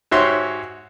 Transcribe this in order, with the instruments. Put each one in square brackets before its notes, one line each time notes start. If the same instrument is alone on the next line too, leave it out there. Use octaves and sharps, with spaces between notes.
[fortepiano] G#2 F#4 G4 C#5 E5 C6